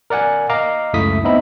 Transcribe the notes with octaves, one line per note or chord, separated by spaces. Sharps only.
A#4 D5 F#5 G#5
D#5 F5 A#5 D6
C#2 F#2 A3 E4 D#6 B6
B3 C4 D#4 D#5 E5 B5